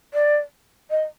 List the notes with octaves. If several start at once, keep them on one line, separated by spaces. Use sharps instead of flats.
D5
D#5